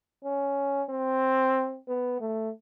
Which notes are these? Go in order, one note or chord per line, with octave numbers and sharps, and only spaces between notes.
C#4
C4
B3
A3